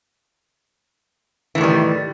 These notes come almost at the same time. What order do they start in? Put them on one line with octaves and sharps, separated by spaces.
E3 A2 D#3 G3